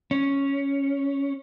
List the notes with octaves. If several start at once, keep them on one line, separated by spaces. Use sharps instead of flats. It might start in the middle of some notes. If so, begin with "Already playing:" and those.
C#4